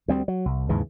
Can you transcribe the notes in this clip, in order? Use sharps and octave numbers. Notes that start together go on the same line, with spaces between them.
D2 G3 C4
F#3
C2
D#2 G#2 C#3 E3